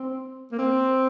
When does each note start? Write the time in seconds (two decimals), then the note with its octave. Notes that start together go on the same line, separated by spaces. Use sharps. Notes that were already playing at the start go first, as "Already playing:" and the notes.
Already playing: C4
0.51 A#3
0.58 C4